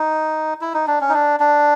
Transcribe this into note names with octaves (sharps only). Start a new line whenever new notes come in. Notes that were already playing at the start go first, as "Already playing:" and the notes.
Already playing: D#4
E4
D#4
D4
C#4
D#4
D4
D4